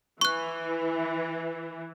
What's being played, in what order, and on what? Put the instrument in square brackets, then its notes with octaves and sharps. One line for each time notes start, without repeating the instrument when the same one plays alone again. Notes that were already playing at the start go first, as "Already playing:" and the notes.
[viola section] E3 [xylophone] C#6 F#6